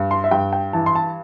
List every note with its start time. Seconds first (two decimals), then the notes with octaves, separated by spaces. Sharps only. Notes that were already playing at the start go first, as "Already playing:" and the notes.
Already playing: G2
0.11 C6
0.24 E5
0.31 G2 G5
0.53 G5
0.73 E3 A5
0.86 C6
0.95 A5